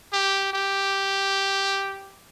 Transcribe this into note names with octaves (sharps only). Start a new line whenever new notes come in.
G4
G4